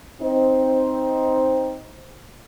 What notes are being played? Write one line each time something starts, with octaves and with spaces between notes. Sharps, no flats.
C4 D#4 C5